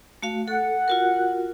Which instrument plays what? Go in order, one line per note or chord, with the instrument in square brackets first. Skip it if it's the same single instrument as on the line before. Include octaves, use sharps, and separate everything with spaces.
[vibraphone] A3 F#4 F5
[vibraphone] A4 [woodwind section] F#5
[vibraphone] F4 F#4 A#4